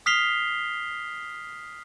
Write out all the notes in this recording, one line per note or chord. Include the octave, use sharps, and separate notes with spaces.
D#6 F6 B6 C7 F7 G7